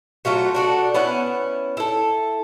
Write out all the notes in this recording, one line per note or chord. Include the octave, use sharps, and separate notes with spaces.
F#3 A3 F4 F#4
D4 F#4 A4
B3 C#4 E4 F#5
E4 A4